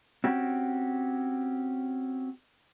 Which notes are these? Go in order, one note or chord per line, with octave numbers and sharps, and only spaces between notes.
C4 C#4 F#4 G4